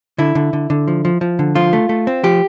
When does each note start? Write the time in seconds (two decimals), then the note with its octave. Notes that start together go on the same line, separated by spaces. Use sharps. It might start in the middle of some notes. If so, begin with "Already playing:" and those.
0.18 D3 E4
0.35 D3
0.53 D3
0.70 D3
0.88 F3
1.05 F3
1.21 F3
1.39 D3
1.55 F3 F4
1.73 A3
1.89 A3
2.07 C4
2.24 F3 G4